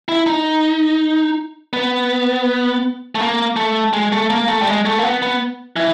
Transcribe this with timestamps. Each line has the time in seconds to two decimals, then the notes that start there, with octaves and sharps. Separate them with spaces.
0.09 E4
0.26 D#4
1.73 B3
3.15 A3
3.20 A#3
3.56 A3
3.93 G#3
4.12 A3
4.30 A#3
4.48 A3
4.62 G3
4.67 G#3
4.85 A3
4.99 A#3
5.03 B3
5.22 B3
5.76 E3